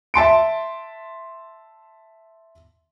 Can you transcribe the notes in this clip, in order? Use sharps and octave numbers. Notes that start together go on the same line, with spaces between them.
E5 A5 C6 D7